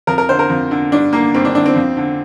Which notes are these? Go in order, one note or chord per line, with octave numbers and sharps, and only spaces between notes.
F2 A#4
A#4
D3 C5
A#4
F2
D3
G2 D4
D3 A#3
G2 C4
D4
D3 D4
C4
F2
D3